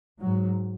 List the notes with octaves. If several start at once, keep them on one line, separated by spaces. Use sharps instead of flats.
G#2 F#3